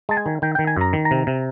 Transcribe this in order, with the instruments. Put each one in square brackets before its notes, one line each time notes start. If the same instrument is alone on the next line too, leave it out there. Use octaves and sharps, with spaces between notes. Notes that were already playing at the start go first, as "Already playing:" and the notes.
[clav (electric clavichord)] G#3 A5
G#5
D#3
D#3 G5
D#3 G5
G#5
F#2 A#5
D#3
A#5
C3
C3